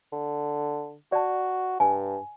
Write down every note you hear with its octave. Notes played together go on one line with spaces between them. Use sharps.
D3
F#4 D5 A5
G2 G#5